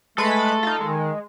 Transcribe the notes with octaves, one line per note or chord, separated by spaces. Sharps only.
G#3 A3 A4 B4 B5
D#4 F4
D#3 G#3